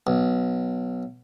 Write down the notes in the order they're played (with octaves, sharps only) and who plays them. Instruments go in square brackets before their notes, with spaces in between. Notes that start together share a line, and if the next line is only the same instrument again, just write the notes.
[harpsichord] B1